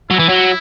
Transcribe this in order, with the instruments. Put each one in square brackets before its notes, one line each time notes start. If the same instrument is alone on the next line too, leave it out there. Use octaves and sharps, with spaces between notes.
[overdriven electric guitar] F#3 [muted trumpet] E4
[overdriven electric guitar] E3
F#3